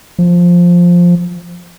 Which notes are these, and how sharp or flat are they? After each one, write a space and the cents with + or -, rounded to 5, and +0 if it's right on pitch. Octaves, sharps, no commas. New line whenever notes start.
F3 +5